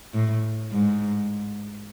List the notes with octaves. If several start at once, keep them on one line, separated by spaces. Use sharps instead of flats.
A2
G#2